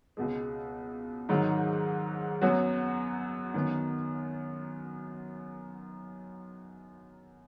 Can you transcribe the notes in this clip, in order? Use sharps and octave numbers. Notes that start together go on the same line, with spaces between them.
C#2 B2 G#3
G#2 D#3 F#3 D#4
F#2 F#3 B3 F#4 C#5
F#2 D#3 B3